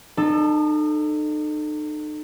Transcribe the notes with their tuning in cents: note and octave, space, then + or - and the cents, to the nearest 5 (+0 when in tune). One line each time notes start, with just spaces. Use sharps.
D#4 -40 A4 +0